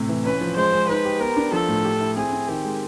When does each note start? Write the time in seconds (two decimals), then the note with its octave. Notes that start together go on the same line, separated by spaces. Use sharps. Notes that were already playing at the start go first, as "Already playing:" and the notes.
Already playing: A2 C3
0.09 E3
0.25 C#4 B4
0.41 F3
0.56 G#3 C5
0.73 G#3
0.89 D#4 B4
1.05 G4
1.20 B3 A#4
1.37 D4
1.52 F3 A4
1.68 A2
1.85 G4
2.00 E4
2.16 C4 G#4
2.33 C4
2.48 D#3 G4
2.65 G#3